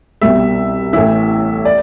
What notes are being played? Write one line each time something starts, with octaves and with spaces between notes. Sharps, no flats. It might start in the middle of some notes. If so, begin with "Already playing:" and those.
C2 B2 G3 E5
A1 A2 E3 E5
D5